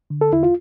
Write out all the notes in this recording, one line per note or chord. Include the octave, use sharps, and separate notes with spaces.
D3
A4
E2 E4
F4